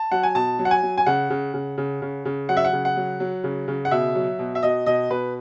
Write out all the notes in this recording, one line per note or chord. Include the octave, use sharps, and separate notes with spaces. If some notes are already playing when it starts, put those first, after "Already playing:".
Already playing: A5
F#3 F#5
G#5
B2 A5
F#3
F#5
G#5
F#3
G#5
C#3 F#5
C#3
C#3
C#3
C#3
C#3
F#3 F#5
E5
F#5
C#3
F#5
F#3
F#3
C#3
C#3
F#5
B2 E5
F#3
B2
E5
B2 D#5
B2 D#5
B2 B4